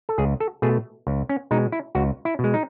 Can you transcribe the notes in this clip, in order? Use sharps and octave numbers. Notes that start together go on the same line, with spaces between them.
A4
C#2 G#4
A4
B2 A3 G#4
C#2
C#4
B2 G#3 D#4
E4
C#2 F#4
E4
B2 G#3
D#4